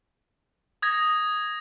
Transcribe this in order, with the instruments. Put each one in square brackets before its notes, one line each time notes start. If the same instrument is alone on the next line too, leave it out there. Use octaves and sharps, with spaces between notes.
[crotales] D#6 G#6 A#6